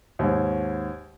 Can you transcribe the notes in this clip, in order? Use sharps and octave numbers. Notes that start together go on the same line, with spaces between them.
D#2 G#2